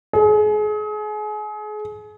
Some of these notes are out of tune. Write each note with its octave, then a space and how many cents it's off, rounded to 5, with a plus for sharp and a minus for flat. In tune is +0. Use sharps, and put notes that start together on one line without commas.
G#4 +35